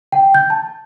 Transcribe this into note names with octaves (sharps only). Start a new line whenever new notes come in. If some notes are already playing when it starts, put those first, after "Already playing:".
G5
G6
A5